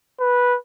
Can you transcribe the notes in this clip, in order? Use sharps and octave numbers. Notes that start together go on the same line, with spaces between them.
B4